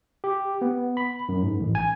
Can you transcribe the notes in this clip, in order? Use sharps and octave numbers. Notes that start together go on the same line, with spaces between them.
G4
B3
B5
F#2
G#2
A1
G#5